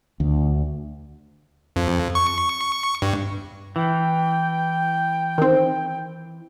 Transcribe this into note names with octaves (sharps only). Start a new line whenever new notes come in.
D2
F2
C#6
G2
E3 G5
D#3 C4